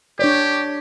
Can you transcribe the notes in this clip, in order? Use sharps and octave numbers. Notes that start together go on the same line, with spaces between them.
D4 G4 C#5 D5